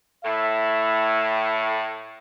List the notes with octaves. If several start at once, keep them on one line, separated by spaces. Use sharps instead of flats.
A2 E5